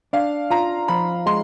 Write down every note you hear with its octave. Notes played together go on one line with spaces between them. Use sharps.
D4 F5
F4 A#5
F3 B5
G#3 C6